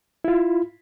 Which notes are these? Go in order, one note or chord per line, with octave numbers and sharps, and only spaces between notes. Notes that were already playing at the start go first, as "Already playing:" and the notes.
E4 F4